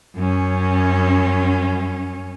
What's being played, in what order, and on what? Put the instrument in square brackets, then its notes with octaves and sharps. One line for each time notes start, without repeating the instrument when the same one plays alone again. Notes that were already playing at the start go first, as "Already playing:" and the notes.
[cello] F#2 C#4